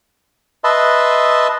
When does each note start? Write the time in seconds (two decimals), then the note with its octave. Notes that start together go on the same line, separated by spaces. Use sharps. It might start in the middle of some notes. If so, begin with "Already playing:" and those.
0.64 B4 D#5 E5 A5 C6